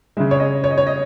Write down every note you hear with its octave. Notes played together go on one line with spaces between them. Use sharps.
C#3 G#3 E5
C#5
D#5
C#5
D#5
C#5
D#5